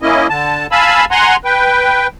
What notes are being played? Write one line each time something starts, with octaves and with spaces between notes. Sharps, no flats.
A#3 C#4 E4 D#5
D3 A5
F5 G#5 A5 B5 E6
F#5 G#5 A#5 C6
B4 G5